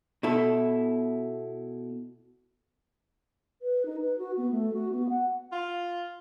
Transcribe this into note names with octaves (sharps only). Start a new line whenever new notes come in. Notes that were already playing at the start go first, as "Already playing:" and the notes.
B2 E4 A4
B4
D#4
B4
F#4
B3
A3
F#4
B3
F#5
F4